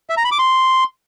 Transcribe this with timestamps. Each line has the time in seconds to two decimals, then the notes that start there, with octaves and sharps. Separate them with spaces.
0.10 E5
0.17 A#5
0.24 B5
0.32 D6
0.39 C6